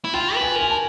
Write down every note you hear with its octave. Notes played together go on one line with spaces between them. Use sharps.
E4
F4 G5
B4
G#5
A#4 G#5
A5